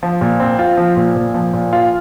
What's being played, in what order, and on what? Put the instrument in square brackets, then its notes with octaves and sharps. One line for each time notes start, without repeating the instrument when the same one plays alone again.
[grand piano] F3
A#2
C4
F4
F3
A#2
A#2
F3
A#2
F4